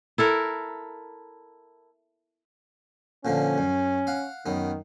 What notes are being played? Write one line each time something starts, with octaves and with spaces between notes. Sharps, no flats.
E4 A4 A#4
A#2 D3 F3 C#4
F#2
F5 F#5
F#2 D#3 B3